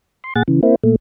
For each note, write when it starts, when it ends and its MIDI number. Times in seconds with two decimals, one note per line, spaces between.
0.24 0.33 84
0.36 0.43 46
0.36 0.43 68
0.36 0.43 78
0.36 0.43 93
0.48 0.61 49
0.48 0.61 52
0.63 0.75 58
0.63 0.75 60
0.63 0.75 64
0.84 0.96 46
0.84 0.96 57